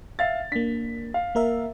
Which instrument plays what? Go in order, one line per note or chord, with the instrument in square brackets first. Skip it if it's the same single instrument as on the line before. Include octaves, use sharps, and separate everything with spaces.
[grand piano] E5 F5 A6
[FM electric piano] A#3 D4 [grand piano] B6
[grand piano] F5
[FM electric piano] A#3 A#4 E5